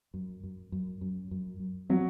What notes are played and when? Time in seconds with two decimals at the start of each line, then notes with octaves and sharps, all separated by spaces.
0.14 F#2
0.43 F#2
0.72 F#2
1.01 F#2
1.31 F#2
1.60 F#2
1.89 F#3 C4